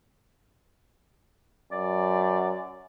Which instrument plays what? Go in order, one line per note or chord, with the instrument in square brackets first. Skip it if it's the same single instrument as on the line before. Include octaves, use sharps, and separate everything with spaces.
[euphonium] F#2 [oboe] D5